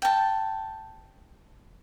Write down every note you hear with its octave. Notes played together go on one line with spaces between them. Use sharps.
G5 A5